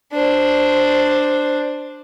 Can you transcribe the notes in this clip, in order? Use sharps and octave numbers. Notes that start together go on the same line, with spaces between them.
D4 C5